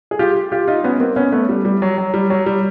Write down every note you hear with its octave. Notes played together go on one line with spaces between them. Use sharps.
G#4
F4 G4
F4 G4
D#4 F4
B3 C#4
A#3 C4
B3 C#4
A3 B3
G3
G3
F#3
F#3
G3
F#3
G3